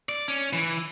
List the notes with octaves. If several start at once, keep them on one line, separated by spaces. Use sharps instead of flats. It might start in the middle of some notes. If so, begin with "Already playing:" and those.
D5
C#4
E3